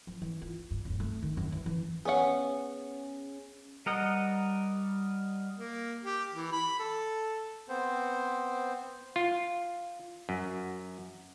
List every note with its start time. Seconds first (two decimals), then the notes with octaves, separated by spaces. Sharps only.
0.07 F3
0.22 E3
0.42 F4
0.71 G2
0.85 D#1
1.00 A3
1.23 D#3
1.37 F#2
1.52 E3
1.66 E3
2.05 B3 C#4 G#4 F#5
3.86 G3 A#4 D#5 F#5
5.58 A#3
6.05 G4
6.34 E3
6.52 B5
6.80 A4
7.69 B3 C4 C5
9.16 F4
10.29 F#2